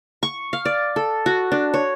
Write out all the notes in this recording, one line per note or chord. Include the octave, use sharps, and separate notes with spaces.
C#6
F5
D5
A4
F#4
D4
C#5